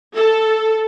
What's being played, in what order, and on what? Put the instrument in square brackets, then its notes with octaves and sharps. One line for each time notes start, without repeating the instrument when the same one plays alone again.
[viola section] A4